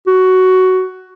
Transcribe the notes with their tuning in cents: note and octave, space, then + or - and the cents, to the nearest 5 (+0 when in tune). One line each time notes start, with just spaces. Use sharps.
F#4 +10